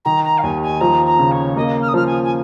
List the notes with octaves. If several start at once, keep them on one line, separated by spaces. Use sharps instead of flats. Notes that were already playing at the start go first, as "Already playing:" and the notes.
D#3 A#5
A#5
F5
D#2 G#5
G#5
F3 A#5
A#5
C#3
C#5
A#3 D#5
F6
D#6
F3 F6
G#5
G#5